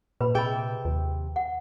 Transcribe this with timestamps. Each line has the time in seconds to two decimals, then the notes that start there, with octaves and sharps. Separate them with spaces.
0.21 A#2 B4 B5
0.35 C3 G#4 D#5 E5 G5 B5
0.85 D#2
1.36 F#5